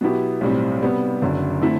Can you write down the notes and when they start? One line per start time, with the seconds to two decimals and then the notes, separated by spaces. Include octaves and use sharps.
0.01 B2 F#3 B3 E4 G4
0.41 B1 A2 G3 C4
0.82 C3 G3 B3
1.22 F#1 F#2 D3
1.62 D3 A3 C4 E4